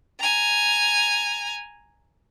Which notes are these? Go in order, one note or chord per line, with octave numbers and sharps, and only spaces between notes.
G#5 A#5